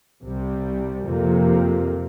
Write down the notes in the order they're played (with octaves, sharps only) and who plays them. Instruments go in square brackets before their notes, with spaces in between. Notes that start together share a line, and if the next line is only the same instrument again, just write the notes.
[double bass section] C2 C3 G3
F2 C3 F3 A#3